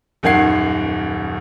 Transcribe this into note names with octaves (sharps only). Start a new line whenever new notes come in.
D#1 F#2 D#3 F#5 G#6 C7